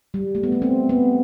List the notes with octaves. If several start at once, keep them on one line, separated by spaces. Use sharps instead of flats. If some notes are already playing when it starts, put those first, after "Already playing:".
G3
A3
B3
A3
C4
B3